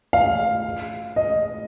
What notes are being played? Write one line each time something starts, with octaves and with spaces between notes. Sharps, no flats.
F5
D#5